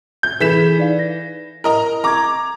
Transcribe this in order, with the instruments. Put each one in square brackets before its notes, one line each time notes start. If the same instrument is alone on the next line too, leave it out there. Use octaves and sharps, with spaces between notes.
[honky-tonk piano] G6
[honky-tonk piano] E3 B6 E7 [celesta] G#4 A4 B5
[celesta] D#4 D5 F5
A#6
[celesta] E4 [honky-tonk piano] A#4 D#5 A#5
[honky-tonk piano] A#5 D6 [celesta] C#6 G#6